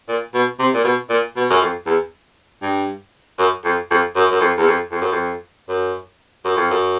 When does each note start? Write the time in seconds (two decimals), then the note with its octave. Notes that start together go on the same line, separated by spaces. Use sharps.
0.09 A#2
0.34 B2
0.59 C3
0.74 A#2
0.85 B2
1.10 A#2
1.36 B2
1.50 F#2
1.61 F2
1.86 E2
2.63 G2
3.39 F#2
3.65 F2
3.91 F2
4.16 F#2
4.31 F#2
4.41 F2
4.58 E2
4.67 F2
4.92 F2
5.02 F#2
5.12 F2
5.69 F#2
6.45 F#2
6.57 F2
6.71 F#2